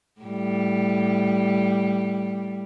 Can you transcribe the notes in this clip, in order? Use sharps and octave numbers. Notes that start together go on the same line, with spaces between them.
A2 G3